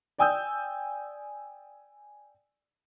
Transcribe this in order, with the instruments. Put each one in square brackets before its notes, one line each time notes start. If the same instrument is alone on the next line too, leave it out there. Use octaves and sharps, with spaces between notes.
[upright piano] D5 G5 G#5 D#6 E6 G6